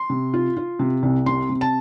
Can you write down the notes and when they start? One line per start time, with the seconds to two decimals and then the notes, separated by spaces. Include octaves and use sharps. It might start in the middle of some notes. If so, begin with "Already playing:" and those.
Already playing: C6
0.10 C3
0.34 F4
0.57 F4
0.79 C3
1.03 C2
1.26 C3 C6
1.49 C3
1.61 A5